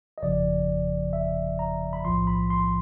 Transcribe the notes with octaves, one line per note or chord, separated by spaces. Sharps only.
D#5
G1 F2 C#3 F3 D5
E5
A#5
B5
B1 A2 F3 C6
B5
C6